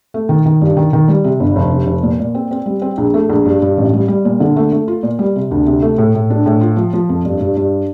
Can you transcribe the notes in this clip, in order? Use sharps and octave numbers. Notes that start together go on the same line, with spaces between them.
A3
D#3
D#3
G2
D#3
D#3
G3
C3
G1
F1
C3
F1
A#2
A#2
C4
C4
G3
C4
A#1
A3
A#1
G2
G2
A1
G3
G3
A#2
D3
A3
A3
F4
A#2
G3
C3
D2
C3
A3
A2
A2
D4
A2
F4
F3
F3
F2
G2
G2
G2